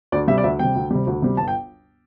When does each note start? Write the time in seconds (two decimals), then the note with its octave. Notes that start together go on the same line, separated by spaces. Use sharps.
0.12 D2 D5
0.28 C3 G3 E5
0.38 D5
0.44 D2 E5
0.59 C3 G3 G5
0.75 D2
0.91 C3 G3
1.07 D2
1.22 C3 G3
1.37 G1 A5
1.48 G5